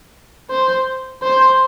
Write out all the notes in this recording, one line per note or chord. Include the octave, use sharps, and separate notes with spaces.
C5
C5